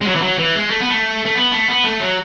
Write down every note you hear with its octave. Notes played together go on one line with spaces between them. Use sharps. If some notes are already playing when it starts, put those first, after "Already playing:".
G#3
F#3
E3
F#3
E3
G#3
A3
B3
A3
A3
B3
A3
B3
A3
F#3